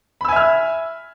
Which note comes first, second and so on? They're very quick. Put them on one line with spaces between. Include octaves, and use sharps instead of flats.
B5 E6 G#5 E5 F6